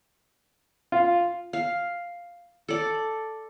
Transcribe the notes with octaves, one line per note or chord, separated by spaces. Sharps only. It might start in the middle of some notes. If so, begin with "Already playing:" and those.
F4
F5
A4 D5